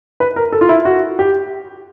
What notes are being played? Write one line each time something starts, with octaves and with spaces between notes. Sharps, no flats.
B4
A#4
A4
F4
E4
F#4
G4